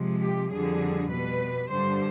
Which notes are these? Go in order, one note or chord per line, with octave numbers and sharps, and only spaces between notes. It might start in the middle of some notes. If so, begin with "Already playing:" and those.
Already playing: C3 F3 G#3
G4
F2 D3 G3 G#4
B2 G3 B4
G2 D3 G3 C5